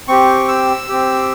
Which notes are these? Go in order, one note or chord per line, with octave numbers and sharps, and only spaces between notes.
C4 G4 C#6
E6
C4 G4